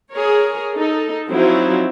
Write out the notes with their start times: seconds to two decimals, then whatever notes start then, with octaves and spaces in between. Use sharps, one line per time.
0.11 G#4 A#4 C#5
0.74 D#4 A4
1.29 F3 F#3 C4 D#4 E4